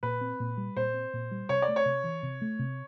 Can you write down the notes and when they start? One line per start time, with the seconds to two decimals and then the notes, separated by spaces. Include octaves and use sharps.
0.03 A#2 B4
0.21 C4
0.40 A#2
0.57 G3
0.76 A#2 C5
0.94 C4
1.13 A#2
1.31 G3
1.49 C3 C#5
1.62 D5
1.68 A3
1.76 C#5
1.86 C3
2.04 E3
2.23 C3
2.42 A3
2.59 C3